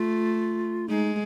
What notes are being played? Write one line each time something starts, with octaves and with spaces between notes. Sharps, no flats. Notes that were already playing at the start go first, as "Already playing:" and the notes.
Already playing: A3 F4
G#3 D#4